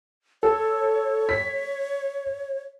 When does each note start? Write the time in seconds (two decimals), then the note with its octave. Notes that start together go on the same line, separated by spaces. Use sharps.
0.43 A4 C#5
1.29 B6